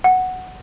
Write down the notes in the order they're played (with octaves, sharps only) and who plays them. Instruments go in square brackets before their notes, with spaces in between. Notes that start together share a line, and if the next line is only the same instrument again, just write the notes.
[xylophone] F#5